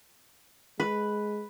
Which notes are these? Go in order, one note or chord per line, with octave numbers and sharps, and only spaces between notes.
G#3 B4